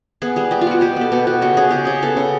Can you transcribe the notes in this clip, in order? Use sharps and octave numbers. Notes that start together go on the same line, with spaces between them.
B3 G#4
G3 G#4
G3 G4
F4
B3 F#4
B2 G4
B3 A4
B2 G4
B2 F#4
C#3 F#4
C#3 G#4
C#3 G4
C#3 G#4
B3 A4
C#3